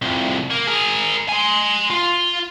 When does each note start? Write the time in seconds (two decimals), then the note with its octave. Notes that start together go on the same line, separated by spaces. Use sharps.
0.02 C2 F2
0.50 A#3
0.67 G#4 A#4
1.29 G#5 C6
1.90 F4